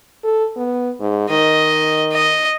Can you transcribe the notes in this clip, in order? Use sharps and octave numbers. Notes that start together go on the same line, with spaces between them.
A4
B3
G#2
D#3 D#5
D#5